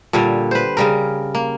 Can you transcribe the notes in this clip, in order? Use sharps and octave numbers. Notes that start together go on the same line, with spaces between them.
A#2 D3 G3 C#5
B4 C5
C#3 G3 A#4
A#3